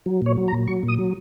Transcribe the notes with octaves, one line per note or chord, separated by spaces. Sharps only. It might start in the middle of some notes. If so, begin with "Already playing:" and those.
F#3
A#2 C#5
F#3
A#5
A#2
F#3 C#6
A#2
D#6
F#3